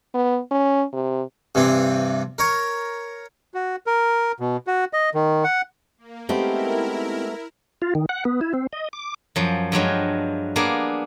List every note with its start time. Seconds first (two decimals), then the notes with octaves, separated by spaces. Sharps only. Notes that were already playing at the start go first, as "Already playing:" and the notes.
0.14 B3
0.51 C#4
0.93 C3
1.55 G2 C3 E3 C4
2.38 A#4 C#5
3.54 F#4
3.87 A#4
4.40 B2
4.67 F#4
4.93 D#5
5.15 D#3
5.44 F#5
5.98 A#3
6.29 G#3 A3 B3 C4 D#4 E4 G4 A#4
7.82 F4
7.95 D#3
8.09 F#5
8.25 B3
8.41 E4
8.54 C4
8.73 D#5
8.93 D6
9.36 F#2 F3
9.72 G2 F3 F#3 G#3
10.56 A#3 B3 D4 G#4